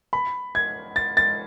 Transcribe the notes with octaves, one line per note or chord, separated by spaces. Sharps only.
B5
G#6
A6
A6